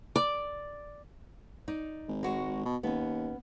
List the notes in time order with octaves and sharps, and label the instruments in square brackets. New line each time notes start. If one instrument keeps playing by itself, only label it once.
[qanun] D5
[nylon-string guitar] D#4 D5
[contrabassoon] G#1
[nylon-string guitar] G#3 F#4 C#5
[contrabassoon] B2
[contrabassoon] D#2 [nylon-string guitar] B3 C#4